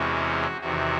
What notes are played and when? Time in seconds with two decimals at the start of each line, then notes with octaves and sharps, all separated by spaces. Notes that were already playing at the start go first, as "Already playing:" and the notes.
Already playing: E2 C3 E3 G#3 C#4 F#4
0.61 E2 C3 D#3 F#4